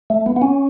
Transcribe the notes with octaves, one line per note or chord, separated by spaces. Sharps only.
A3
B3
B3
C#4